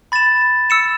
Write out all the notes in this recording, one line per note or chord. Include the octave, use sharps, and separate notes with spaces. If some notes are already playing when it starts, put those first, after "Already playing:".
B5 A6 E7
E6 C#7 E7